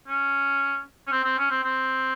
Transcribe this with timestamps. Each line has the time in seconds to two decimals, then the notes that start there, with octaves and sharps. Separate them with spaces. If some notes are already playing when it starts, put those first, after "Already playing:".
0.08 C#4
1.07 C#4
1.12 C4
1.24 C4
1.38 C#4
1.50 C4
1.64 C4